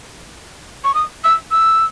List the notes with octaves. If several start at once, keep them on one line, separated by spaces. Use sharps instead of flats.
C#6
D#6
E6
E6